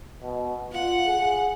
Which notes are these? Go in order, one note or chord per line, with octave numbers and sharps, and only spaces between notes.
B2
F4 F#5
G#4